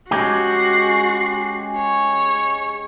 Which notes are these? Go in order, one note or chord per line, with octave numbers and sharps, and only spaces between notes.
G#3 C#4 F#4 G4 C7
C#5